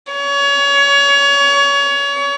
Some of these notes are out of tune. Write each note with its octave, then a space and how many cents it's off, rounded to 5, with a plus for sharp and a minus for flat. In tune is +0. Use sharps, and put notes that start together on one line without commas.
C#5 +25